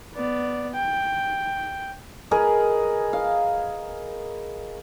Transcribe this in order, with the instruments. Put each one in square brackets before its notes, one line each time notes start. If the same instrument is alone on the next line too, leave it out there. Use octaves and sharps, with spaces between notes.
[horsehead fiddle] B3 D5
G5
[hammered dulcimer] G#4 A#4 B4 D#5
F5